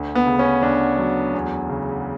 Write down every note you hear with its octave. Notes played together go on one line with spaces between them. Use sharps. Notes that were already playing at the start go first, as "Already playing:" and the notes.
Already playing: D2
B3
C#3
C#4
D2 D4
F#3
E2
C#3